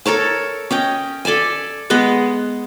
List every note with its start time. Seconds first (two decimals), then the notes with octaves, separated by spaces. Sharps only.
0.06 A4 A#4 C#5 A5
0.71 C#4 D#5 G5
1.25 A4 D5 E5 G#5
1.90 G#3 B3 D#5 F#5